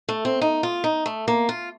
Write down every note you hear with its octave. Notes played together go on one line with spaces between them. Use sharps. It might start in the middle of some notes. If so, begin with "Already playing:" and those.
A3
C4
D#4
F4
D#4
A3
A#3
F4